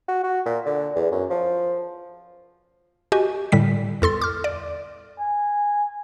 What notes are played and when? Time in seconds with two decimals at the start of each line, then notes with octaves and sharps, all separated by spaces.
0.08 F#4
0.23 F#4
0.46 A#2
0.66 D3
0.96 E2
1.11 F#2
1.30 F3
3.12 F#4 G4 D#5 G#5
3.52 A2 D3 G3 B6
4.02 E2 A4 C6 A6
4.22 D6 F6
4.44 D5
5.20 G#5